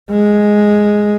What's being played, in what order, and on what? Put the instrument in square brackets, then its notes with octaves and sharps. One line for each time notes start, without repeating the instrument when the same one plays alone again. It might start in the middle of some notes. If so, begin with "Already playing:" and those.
[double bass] G#3